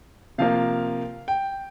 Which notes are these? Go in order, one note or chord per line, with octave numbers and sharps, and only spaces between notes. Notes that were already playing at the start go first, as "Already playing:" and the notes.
C3 F3 A#3 F5
G5